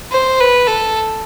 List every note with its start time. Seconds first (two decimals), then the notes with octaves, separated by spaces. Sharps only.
0.12 C5
0.40 B4
0.68 A4